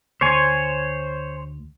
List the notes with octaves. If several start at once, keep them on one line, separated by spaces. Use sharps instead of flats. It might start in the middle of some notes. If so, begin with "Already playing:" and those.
D2 C5 C#5 G#5